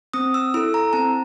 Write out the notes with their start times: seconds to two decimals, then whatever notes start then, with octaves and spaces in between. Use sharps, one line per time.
0.13 C4 D#6
0.34 E6
0.54 E4 A4 E6
0.74 A#5
0.93 C4 A5